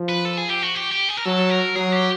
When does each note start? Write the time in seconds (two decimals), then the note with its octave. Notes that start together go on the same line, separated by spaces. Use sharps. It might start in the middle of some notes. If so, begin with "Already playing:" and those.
Already playing: F3
0.09 B4
0.25 A4
0.37 G#4
0.50 G4
0.63 F#4
0.75 G4
0.91 G4
1.09 G#4
1.17 A#4
1.25 F#3 A4
1.50 A#4
1.76 F#3 G#4
1.92 G4